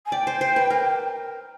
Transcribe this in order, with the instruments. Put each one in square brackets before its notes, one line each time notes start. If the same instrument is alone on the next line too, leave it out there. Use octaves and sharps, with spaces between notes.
[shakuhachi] G#5
[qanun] D5 [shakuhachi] G5
[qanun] C5
C5
B4
A#4